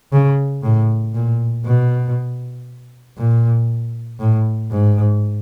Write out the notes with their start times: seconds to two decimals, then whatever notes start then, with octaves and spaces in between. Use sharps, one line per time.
0.12 C#3
0.63 A2
1.14 A#2
1.65 B2
3.18 A#2
4.19 A2
4.70 G#2